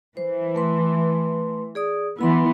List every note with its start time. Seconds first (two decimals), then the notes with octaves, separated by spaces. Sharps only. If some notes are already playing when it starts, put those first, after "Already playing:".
0.17 E3 C5
0.55 A3 B4 C6
1.75 G#4 D5 D#6
2.19 E3 B3 E4 B5 C6